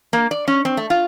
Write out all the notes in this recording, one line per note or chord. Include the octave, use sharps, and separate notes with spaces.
A#3
D5
C#4
C4
A3
F4